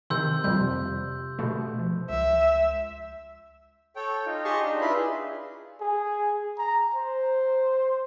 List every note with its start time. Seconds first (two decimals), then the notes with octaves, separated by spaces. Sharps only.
0.10 C3 D#3 C6 E6 G6
0.44 F2 C3 G3 G6
1.39 B2 A3
1.79 F3
2.10 C#2 E5
3.96 A4 C#5 G5
4.26 D#4 F4
4.45 G4 G#4 D#5 A5 C6 C#6
4.64 D4 D#4
4.81 E4 F4 B4 B5 C6
4.96 G#4
5.80 G#4
6.58 A#5
6.94 C5